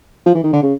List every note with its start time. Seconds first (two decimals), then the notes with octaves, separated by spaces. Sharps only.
0.26 F3
0.35 E3
0.44 D#3
0.53 D3
0.62 C#3